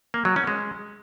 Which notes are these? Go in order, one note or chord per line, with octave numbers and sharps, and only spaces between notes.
A#3
F#3
C#4
G#3